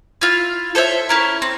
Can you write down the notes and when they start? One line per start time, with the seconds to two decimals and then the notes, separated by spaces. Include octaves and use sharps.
0.21 E4 F4
0.75 A4 C5 C#5 E5
1.09 C#4 E4 A#4
1.42 C4